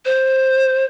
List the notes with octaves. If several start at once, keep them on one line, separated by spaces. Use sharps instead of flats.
C5